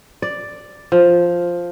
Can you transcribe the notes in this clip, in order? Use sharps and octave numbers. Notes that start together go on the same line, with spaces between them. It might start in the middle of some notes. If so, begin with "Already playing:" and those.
D5
F3